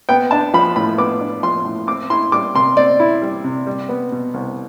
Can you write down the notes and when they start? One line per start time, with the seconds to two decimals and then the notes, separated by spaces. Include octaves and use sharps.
0.09 B3 G5
0.31 D4 A5
0.54 F3 B5
0.76 A2 B5
0.98 B3 D6
1.21 D4
1.43 F3 C6
1.65 A2
1.87 C4 D6
2.10 E4 C6
2.32 G3 D6
2.55 C3 C6
2.77 C4 D5
3.00 E4
3.22 G3
3.44 C3
3.67 G3
3.89 B3
4.12 B2
4.34 C2